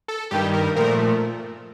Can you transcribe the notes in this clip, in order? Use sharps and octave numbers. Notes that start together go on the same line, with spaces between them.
A4
G2 D#3 G3 G4
A#4
A#2 F3 A3 A#4